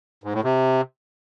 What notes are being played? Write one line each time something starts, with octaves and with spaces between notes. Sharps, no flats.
G#2
A2
C3